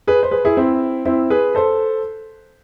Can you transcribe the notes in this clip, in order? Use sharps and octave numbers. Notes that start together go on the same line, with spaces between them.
G#4 B4
C5
G#4 B4
E4 G#4
C4 E4
C4 E4
G#4 B4
A4 C5